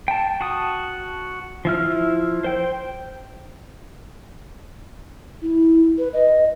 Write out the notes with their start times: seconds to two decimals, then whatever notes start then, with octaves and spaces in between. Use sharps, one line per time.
0.08 G5 A5
0.41 F#4 A5 D#6
1.65 F3 E4 F6
2.44 C5 G5
5.42 E4
5.98 B4
6.13 D#5